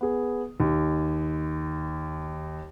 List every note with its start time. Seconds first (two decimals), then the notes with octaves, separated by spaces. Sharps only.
0.01 B3 G#4
0.60 D#2